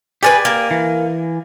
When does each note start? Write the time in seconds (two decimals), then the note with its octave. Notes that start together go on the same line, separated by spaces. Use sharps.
0.23 G4 G#4 A#4 B4 D5 G#5
0.45 A#3
0.71 E3